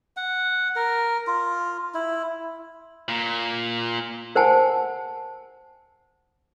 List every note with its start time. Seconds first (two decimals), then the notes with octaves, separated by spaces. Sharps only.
0.17 F#5
0.76 A#4
1.27 F4
1.94 E4
3.08 A#2
4.35 A#4 C5 F#5 G#5 A5